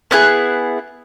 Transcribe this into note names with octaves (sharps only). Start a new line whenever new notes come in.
B3 E4 G#4 F#6